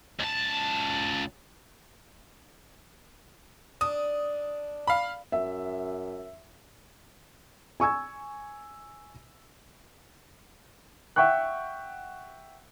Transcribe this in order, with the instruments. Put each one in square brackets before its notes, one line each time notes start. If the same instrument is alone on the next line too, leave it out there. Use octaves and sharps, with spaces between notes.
[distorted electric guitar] C#2 A5
[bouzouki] D4 [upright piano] D#6
[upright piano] F5 B5
[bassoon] F#2 [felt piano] E5
[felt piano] G#5 C#6 E6 G#6
[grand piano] E5 F#5 G5 C#6 F#6